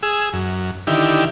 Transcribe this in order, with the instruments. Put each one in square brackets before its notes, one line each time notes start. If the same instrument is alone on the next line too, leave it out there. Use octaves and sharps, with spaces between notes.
[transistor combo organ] G#4 E6
F#2
D3 D#3 E4 G4